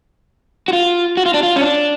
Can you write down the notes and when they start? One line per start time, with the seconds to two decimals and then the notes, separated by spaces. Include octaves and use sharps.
0.68 F#4
0.73 F4
1.17 F#4
1.26 F4
1.34 D4
1.43 F4
1.56 C#4
1.61 D4